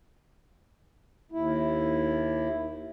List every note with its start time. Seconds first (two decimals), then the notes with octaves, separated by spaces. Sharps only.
1.32 D#2 E4